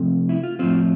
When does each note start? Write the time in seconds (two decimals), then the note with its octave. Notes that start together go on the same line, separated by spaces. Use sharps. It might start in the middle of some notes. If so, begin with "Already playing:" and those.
Already playing: C3 F3 A3 C4
0.29 E4
0.43 F4
0.59 A2 F3 C4 F4